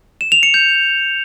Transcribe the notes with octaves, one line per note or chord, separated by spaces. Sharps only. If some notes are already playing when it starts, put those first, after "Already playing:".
E7
F7
C#7
G6